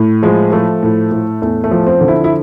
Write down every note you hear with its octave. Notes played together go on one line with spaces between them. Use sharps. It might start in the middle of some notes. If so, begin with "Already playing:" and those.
Already playing: A2
F3 G#3
F3 A3
A2
A2
E2 A3
A3
F3
C4
D3
E4
E4